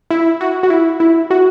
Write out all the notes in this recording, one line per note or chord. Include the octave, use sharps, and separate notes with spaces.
E4
F#4
F#4
E4
E4
F#4